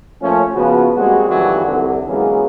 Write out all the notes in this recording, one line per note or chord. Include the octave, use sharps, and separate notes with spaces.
F3 A3 A#3 C#4
C#3 F3 B3 F#4
G3 G#3 A#3 C4 F#4
C2 F2 D#3 E3 F#3 G3
C2 D3
E3 F#3 G#3 A#3 B3 C#4